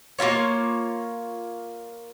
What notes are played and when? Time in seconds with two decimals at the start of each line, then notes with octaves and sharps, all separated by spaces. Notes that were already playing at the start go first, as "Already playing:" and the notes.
0.19 A#3 E4 F4 C#5